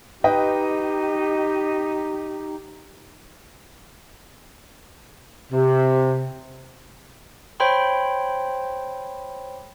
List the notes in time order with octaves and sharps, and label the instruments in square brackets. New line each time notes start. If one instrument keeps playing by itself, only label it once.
[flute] D#4 [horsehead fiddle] G4 [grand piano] B4 D#5 G5
[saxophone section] C3
[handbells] C5 C#5 G5 B5 C6